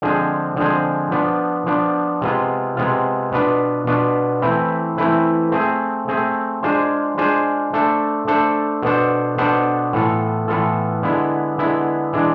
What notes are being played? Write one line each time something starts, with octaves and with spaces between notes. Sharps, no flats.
D3 F3 G#3 C4 G#4
D3 F3 G#3 C4 G#4
F3 B3 D4
F3 B3 D4
C3 G#3 B3 F4
C3 G#3 B3 F4
B2 B3 D4 F4 B4
B2 B3 D4 F4 B4
E3 A3 C4 E4 B4
E3 A3 C4 E4 B4
A3 C4 G#4
A3 C4 G#4
G#3 D4 F4 G#4 C5
G#3 D4 F4 G#4 C5
A3 D4 A4 C5
A3 D4 A4 C5
B2 B3 D4 A4 C5
B2 B3 D4 A4 C5
A2 E3 B3 F4 A4
A2 E3 B3 F4 A4
D3 G#3 B3 E4
D3 G#3 B3 E4
E3 G#3 D4